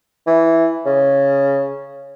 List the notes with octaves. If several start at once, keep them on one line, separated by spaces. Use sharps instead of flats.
E3
C#3